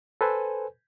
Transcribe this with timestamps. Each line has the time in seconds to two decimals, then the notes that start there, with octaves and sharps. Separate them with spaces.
0.21 A4 B4 C5 G#5